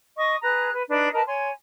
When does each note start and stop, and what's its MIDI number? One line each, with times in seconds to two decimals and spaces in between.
0.17 0.36 75
0.17 0.36 85
0.17 0.36 87
0.42 0.70 68
0.42 0.70 71
0.42 0.70 82
0.42 0.70 90
0.74 0.83 71
0.89 1.09 62
0.89 1.09 63
0.89 1.09 71
1.13 1.21 70
1.13 1.21 71
1.13 1.21 75
1.13 1.21 81
1.26 1.48 73
1.26 1.48 80
1.26 1.48 84